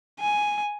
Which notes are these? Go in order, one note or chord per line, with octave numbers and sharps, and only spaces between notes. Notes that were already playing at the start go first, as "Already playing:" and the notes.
G#5